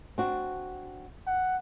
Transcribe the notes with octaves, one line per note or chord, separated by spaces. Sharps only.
C4 D4 F#4
F#5